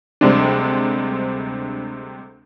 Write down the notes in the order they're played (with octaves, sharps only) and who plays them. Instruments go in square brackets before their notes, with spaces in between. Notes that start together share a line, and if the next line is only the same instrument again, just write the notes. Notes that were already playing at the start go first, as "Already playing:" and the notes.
[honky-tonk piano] D2 C3 G3 G#3 C4 D4